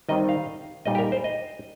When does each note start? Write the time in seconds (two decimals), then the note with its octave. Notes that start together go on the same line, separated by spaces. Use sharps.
0.09 D#3 G3 C4 D#4 D#5
0.29 F5
0.86 A#2 G3 D#4 D#5
0.95 G4
0.98 A#4
1.12 C5
1.24 D#5